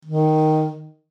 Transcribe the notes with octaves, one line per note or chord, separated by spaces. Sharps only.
D#3